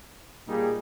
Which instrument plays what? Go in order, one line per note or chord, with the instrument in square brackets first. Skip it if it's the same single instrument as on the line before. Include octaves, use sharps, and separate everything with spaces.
[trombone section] A#2 G3 A#3 D#4 G#4